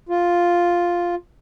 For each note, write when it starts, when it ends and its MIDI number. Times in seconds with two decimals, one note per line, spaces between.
0.09 1.15 65